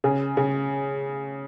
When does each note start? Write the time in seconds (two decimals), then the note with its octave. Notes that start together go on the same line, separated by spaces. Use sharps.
0.04 C#3
0.37 C#3